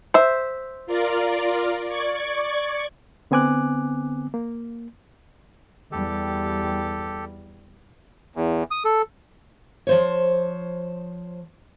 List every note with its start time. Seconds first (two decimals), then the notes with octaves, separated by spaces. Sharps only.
0.14 C5 E5
0.86 F4 A#4 D5
1.88 D5 C#6 G#6
3.31 D3 B3 C4 G#5 D6 F#6
4.34 A#3
5.92 E2 G3 G4 A4
8.36 E2
8.71 D#6
8.85 A4
9.87 F3 C5 C#5